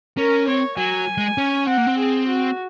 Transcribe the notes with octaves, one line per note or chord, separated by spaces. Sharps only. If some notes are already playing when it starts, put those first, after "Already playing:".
C#4 A#4
C4 C#5
F#3 G#5
G#3
C#4
C4 F#5
A#3
C4
G#4
F#4